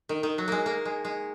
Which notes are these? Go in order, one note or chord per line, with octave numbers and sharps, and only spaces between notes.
D#3
D#3
F#3
G#3 A#3
A#3
G#3
G#3